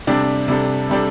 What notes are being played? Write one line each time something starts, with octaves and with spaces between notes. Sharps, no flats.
C3 G3 D4 A4
C3 G3 D4 A4
C3 G3 D4 A4